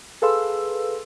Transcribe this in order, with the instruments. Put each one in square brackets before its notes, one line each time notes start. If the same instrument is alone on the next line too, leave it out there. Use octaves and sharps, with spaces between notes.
[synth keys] G#4 A4 B4 F5 C6 E6